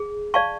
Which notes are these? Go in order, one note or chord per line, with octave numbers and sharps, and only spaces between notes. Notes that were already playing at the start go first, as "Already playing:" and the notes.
Already playing: G#4
D5 F5 A5 C#6